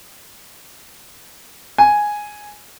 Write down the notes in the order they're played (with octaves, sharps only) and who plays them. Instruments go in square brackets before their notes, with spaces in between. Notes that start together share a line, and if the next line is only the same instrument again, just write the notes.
[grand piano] G#5